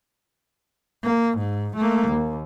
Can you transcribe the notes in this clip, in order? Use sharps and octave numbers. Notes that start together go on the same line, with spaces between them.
A#3
G#2
A3 A#3
D#2